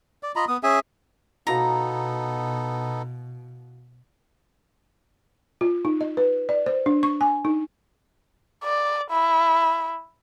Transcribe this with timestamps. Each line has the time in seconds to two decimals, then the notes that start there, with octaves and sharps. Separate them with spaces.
0.23 D5
0.36 F4 D#5 A#5 B5
0.48 B3 D#6
0.63 C#4 G#4 E5 G#5
1.47 B2 B3 D#4 E4 F#4 A4 F5 A#5
5.61 F4
5.85 D#4
6.01 D#5
6.17 B4
6.49 D5
6.66 C5
6.86 D4
7.03 C#6
7.21 G#5
7.45 D#4
8.64 D5
9.11 E4